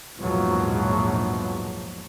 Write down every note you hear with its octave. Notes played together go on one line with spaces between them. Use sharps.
A#1 E2 G#2 B2 F3 F#3